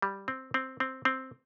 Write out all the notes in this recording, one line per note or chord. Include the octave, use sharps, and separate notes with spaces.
G3
C4
C4
C4
C4